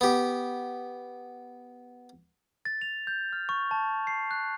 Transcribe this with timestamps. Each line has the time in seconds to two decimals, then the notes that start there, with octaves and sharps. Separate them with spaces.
0.01 B3 G4
2.65 A6
2.82 F7
3.07 G6
3.33 F6
3.49 C#6
3.71 A5
4.07 C7
4.31 F#6